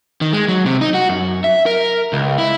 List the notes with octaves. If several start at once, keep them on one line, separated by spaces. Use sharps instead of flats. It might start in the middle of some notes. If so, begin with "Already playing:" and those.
D#3
G#3
F#3
C3
D#4
F#4
F#2
E5
A#4
C#2
E4